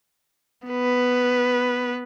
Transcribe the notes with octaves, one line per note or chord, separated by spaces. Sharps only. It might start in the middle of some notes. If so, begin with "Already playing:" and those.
B3 B4